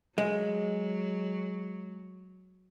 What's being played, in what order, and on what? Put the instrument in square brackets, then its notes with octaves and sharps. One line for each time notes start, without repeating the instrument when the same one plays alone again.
[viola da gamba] F#3 [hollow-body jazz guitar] G#3